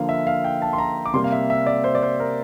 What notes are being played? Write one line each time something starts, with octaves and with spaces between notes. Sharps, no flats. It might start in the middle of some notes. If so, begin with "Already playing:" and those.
Already playing: D3 F3 A#3 F5
E5
F5
G5
A5
C6
A#5
D6
C3 G3 A#3 C6
F5
E5
E5
D5
C5
D5
C5
A#4